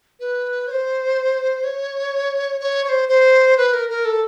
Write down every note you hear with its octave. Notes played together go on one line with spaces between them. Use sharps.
B4
C#5
C5
C#5
C#5
C#5
C5
C5
B4
A#4
A#4
A4